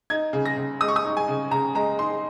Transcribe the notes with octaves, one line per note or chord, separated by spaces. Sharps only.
D#4 G#6
C#3
A#6
C#3
G#3 D#6
C#6
D#6
D#4
G#5
C#3
C#3 A#5
G#3 A#5
D#4 C6